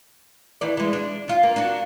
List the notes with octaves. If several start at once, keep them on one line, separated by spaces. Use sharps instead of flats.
D#3 E3 D5
E3 G#3
D4
D#3 F4
A#3
D4 F#4